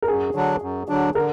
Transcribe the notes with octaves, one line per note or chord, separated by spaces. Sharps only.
A#4
F#2 G#4
D3 F#3 D4
F#2
D3 F#3 D4
D3 A#4